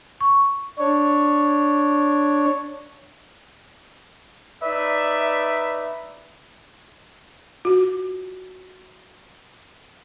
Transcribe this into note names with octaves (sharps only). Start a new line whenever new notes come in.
C#6
D4 C#5
D#4 B4 D5 E5
F4 F#4